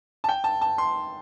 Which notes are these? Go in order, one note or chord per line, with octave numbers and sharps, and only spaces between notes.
A5
G5
A5
A5
C6